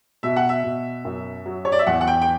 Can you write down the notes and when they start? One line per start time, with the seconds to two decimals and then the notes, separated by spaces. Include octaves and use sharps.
0.23 B2 E5
0.36 F#5
0.49 E5
0.64 B2
1.05 F#2
1.46 F#3
1.65 C#5
1.72 D5
1.79 E5
1.87 E2 F#5
2.01 F#5
2.07 G5
2.22 G5